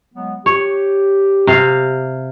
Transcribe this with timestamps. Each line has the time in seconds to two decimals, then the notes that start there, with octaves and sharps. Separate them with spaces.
0.14 F#3 G#3 B3
0.46 G4 C#5
1.47 C3 F5